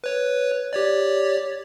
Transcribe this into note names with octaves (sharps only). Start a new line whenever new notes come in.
B4 C#5
G4 C#5 D5